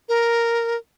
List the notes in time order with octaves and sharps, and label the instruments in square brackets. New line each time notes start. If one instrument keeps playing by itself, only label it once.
[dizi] A#4